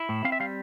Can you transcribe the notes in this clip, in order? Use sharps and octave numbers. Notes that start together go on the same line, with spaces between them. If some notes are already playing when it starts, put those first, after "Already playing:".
Already playing: E4
A2
C4 F5
E5
G3 F5